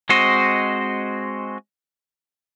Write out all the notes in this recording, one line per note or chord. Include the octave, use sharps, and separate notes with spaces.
G#3 C4 F#4 C5 D#5